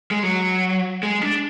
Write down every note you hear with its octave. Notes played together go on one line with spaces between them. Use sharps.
G#3
F#3
G#3
D4